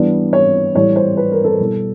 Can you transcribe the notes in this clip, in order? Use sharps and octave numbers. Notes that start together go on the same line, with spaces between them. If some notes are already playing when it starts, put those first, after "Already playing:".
Already playing: E3 G3 B3 D4
C#5
A2 E3 G3 C#5
C5
B4
A#4
A4
B2 G3 B3 E4